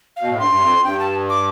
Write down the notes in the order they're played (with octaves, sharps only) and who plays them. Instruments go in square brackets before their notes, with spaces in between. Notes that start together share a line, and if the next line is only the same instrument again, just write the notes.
[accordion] B2 [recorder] F5
[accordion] A2
[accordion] G2 [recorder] C6
[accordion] G2
F2
[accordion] G2 [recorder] G5
[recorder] A5
D6